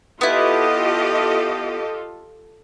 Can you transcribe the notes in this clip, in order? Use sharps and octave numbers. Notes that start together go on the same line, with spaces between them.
B3 E4 F4 G4 A4 D#5